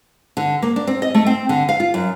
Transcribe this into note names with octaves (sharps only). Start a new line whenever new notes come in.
D3
A#3
D4
C4
D#5
A3
C4
D3
F5
F4
F#2